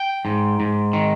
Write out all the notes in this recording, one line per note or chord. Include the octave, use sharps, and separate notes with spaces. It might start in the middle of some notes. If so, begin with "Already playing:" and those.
Already playing: G5
G#2
G#2
D#3